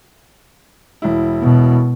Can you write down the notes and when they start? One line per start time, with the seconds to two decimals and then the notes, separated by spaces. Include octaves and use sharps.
1.02 E1 E4
1.42 B2